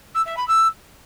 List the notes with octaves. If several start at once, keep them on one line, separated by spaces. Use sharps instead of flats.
E6
E5
B5
E6